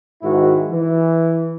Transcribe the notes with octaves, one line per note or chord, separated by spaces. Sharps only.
G#2 D#3 E4 F#4
E3